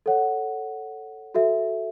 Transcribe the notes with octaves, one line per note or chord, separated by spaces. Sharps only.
A4 C#5 F#5
F#4 A4 E5